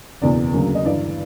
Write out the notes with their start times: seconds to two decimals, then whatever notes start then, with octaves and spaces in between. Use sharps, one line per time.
0.21 F#1 E2 B2 D5
0.54 D2 C#3 F#3 A#3
0.75 D#5
0.85 G1 G2 E3 D5